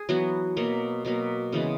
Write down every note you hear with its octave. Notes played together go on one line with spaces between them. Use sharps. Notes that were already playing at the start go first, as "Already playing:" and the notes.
Already playing: G#4
E3 F#3 B3 F#4
B2 F#3 A#3
B2 F#3 A#3
C#3 E3 G#3 B3